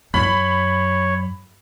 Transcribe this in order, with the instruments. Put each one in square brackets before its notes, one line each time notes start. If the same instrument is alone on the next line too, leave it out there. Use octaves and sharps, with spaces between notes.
[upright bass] F#2 [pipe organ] C#5 [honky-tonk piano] B5